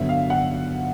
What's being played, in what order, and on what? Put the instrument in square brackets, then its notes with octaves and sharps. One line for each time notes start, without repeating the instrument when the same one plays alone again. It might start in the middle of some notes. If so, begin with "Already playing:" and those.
Already playing: [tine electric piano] G2 D3 F#3 B3 [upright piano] E5
[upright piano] F5
F#5